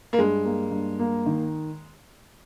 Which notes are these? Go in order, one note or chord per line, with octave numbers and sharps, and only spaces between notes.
A#3
G2 G#3
A#3
G2
A#3
D#3